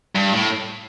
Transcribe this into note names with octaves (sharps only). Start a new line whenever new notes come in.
G2
A2